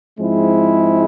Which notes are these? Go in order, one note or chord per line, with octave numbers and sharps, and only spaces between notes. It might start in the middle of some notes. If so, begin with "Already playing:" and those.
G#2 F3 G#3 C4 E4